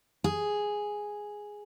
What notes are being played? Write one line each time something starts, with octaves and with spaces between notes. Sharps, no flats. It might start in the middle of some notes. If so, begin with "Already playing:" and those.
G#4